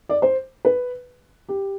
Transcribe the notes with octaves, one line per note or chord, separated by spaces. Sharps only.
D5
C5
B4
G4